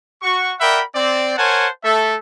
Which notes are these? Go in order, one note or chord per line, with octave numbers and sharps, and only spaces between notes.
F#4 C#6
A#4 D5 E5 F#5 G5 B5
C4 D5
A#4 C5 C#5 F#5 G#5 A5
A3 A4 E5